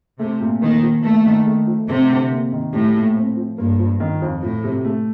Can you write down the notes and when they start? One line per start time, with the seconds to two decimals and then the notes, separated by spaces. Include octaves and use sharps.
0.19 C3 A3
0.40 A#2
0.62 D#3 A#3
0.82 F3
1.04 A3 A#3
1.26 D#3
1.46 A3
1.67 F3
1.89 C3 A3
2.10 D3
2.31 A#3
2.52 D#3
2.73 A2 G3
2.95 A#2
3.16 C4
3.37 F3
3.58 G2 A#3
3.79 F3
4.00 D#3
4.22 F2
4.42 A2 F3
4.64 C3
4.85 A3